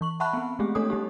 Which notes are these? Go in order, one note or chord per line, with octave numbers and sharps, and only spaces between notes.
E3 C#6 F#7
E5 F#5 A5 B5 C#6 F#6
B3 C4
G#3 A3 C4 G4 G#4
A3 D4 A4 C#5 D#6
G3 D#4 G4